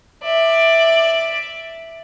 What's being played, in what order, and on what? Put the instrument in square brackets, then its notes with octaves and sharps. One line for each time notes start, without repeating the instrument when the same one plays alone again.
[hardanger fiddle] D5 E5